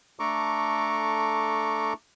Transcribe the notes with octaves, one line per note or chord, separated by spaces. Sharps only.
A3 D4 A4 A#5 C#6 D6